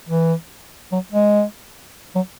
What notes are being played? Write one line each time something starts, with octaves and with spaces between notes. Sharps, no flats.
E3
F#3
G#3
F#3